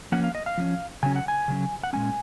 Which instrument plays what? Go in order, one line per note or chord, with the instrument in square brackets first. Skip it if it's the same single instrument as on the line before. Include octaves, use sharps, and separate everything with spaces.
[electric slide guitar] F3 A#3 C#4 F#5
F5
D#5
F5
F3 A#3 C#4
C#3 F#3 C#4 G#5
F#5
G#5
C#3 F#3 C#4
F#5
A#2 G#3 C#4 G#5